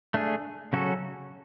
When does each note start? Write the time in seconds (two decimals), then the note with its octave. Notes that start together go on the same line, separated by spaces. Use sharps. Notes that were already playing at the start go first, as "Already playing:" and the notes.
0.14 A3 D4 G#4
0.73 C#3 F#3 C#4 F#4 A4